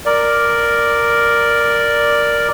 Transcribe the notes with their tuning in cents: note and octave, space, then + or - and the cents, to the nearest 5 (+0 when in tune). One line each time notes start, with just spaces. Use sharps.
A#4 +0 D5 +0